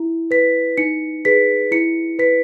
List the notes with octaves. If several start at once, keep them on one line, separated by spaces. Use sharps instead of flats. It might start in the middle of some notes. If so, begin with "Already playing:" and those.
Already playing: E4
B4 B6
D#4 C#7
G#4 B4 B6
E4 C#7
B4 B6